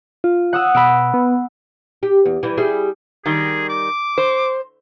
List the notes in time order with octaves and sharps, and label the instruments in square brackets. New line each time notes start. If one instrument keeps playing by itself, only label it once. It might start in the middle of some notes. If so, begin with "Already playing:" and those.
[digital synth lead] F4
[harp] F#5 D#6 E6
[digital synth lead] B2 [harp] B5 E6 D7
[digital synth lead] B3
[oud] G4
E2
E3 G3
G3 E4 G#4
[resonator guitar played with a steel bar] D#3 G3 [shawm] G#4
[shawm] D6
[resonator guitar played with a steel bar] C5